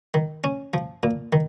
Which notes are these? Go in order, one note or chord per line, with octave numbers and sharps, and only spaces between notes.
D#3
C#4
F3
A#2
D#3